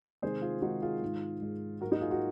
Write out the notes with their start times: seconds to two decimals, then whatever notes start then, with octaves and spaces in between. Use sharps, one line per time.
0.22 C3 D#3 G#3 G#4 C5
0.42 F4 G#4
0.62 C3 D#3 G#3 D#4 F#4
0.82 F4 G#4
1.02 G#2 D#3 G#3
1.42 G#2 D#3 G#3
1.81 G#2 F#3 A#3 F#4 A#4
1.91 D#4 F#4
2.01 F4 G#4
2.10 F#4 A#4